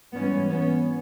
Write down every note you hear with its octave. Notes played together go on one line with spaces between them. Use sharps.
G#2 E3 G3 B3 C#4
B3 C#4